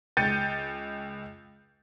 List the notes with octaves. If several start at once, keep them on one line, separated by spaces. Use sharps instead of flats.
C#2 G5 G6 A6 C#7 D#7